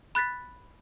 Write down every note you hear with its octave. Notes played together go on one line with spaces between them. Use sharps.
B5 F#6 A6 B6